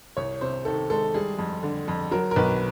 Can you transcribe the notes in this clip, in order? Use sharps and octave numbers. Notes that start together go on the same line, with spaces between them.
C2 C#5
C3 C5
D#3 A4
G#3 A4
G3 G#4
F2
D3
F2
F#3 A#4
A#4
B1 B4